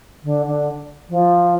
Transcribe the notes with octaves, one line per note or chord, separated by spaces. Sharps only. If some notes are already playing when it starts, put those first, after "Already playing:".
D3
D3
F3